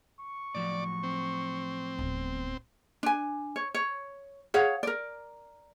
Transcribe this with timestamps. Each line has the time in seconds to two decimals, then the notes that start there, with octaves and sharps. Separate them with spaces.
0.20 C#6
0.55 A2 F3 F#3 D5
1.03 C4
1.99 D1 B3
3.03 D4 G#5
3.56 C#5
3.74 C#5
4.54 G#4 C#5 F5 F#5
4.83 A#4 D5